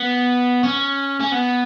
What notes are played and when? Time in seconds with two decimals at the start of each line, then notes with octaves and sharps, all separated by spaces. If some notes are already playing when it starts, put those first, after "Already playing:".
Already playing: B3
0.64 C#4
1.21 C#4
1.32 B3